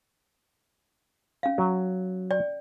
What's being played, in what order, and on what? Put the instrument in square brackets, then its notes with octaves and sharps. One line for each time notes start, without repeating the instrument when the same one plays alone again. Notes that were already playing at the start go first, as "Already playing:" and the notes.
[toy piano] C#4 F5
[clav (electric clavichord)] F#3
[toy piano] D5 G5